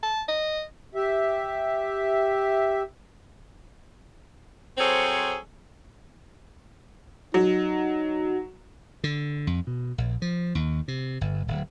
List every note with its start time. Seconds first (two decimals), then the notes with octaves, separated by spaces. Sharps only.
0.03 A5
0.28 D#5
0.95 G4 E5
4.78 F#3 C4 G#4 A4 C5 C#5
7.34 F#3 D#4
9.04 D3
9.47 F2
9.67 B2
9.98 A#1
10.22 F3
10.55 D#2
10.88 C3
11.21 G1
11.48 D1